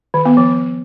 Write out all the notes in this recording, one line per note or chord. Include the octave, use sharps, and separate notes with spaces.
D#3
B3
F3